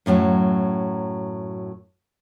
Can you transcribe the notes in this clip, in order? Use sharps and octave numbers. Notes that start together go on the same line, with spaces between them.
F#2 A2 D3 F#3